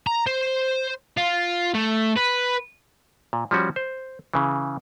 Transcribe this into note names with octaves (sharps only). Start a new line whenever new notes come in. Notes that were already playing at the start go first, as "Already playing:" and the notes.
A#5
C5
F4
A3
B4
A#2
F3 G3 C#4 F#4
C5
C#3 E3